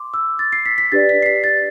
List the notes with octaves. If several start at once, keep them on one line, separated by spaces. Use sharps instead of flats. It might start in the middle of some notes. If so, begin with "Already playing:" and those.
Already playing: C6 D6
E6
A6
C7
B6
B6
D4 G4 B4 D5 A6
B6
C7
B6
A6